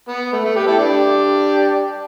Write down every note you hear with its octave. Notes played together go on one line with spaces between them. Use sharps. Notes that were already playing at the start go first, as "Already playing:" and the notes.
B3
A3
A3
G4 B4
E4 A4
D4 G4